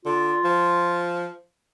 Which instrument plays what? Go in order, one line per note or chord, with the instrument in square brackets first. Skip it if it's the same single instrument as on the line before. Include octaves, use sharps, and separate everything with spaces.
[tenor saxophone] D3 [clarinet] F4
[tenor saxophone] F3